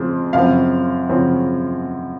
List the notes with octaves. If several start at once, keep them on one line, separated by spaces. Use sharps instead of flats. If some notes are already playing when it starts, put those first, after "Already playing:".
Already playing: F2 C#3 F3 G#3 C4
F#2 C#3 F3 C4 F5
F#2 C#3 F3 C4